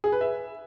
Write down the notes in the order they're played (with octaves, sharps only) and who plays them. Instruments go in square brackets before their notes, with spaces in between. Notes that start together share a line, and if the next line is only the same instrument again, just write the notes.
[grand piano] G#4
B4
E5